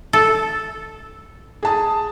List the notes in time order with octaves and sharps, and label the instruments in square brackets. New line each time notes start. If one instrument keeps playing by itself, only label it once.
[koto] A4
[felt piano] G#4 A5 D#6